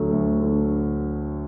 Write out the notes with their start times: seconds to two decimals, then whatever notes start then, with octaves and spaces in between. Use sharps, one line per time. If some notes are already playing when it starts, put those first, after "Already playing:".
Already playing: D2 D3 F#3 A3
0.11 D2
0.41 D3